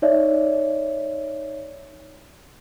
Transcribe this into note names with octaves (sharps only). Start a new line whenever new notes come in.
D#4 C#5 D5 E5